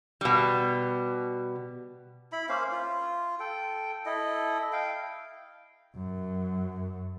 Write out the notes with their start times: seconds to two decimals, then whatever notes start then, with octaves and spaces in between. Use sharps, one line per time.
0.21 B2 G3
2.32 E4 B5
2.49 A#3 C#4 C5 F5
2.72 F4
3.39 A4 G5
4.06 E4 A4 D#5
4.73 F5 G5
5.96 F#2